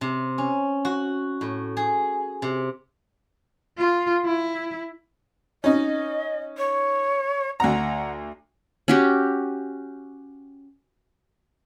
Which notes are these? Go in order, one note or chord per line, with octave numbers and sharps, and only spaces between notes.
C3
C#4
F#4
A2
G#4
C3
F4
E4
C#4 D#4 D#5
C#5
D2 F#5 A#5
C#4 F#4 G4